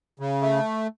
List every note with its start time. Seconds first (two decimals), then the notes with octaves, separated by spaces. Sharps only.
0.20 C#3
0.42 A3